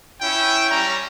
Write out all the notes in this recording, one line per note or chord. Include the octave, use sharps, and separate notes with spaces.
C#4 E4 G5
G3 C#4 A#5